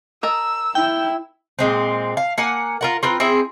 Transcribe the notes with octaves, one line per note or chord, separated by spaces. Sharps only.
A#4 D#5 A5 E6
E4 G5 E6
A#2 D3 G#3 C4
F5
A#3 F#5 G#5
F4 A#4 F#5
C4 F4 A#4 B4
C4 E4 G#4 E5